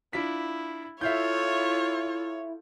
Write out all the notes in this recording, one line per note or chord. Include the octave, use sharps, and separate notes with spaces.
D4 E4 F4 B6
E4 F4 A4 C#5 E5 F5 G6